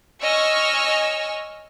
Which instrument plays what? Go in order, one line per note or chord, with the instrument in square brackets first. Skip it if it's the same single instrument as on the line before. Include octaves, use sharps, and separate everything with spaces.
[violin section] C#5 D#5 G#5 C#6 E6 F6